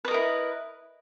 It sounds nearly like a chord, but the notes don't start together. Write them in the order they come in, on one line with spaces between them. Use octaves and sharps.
B4 D#5 A#4 E4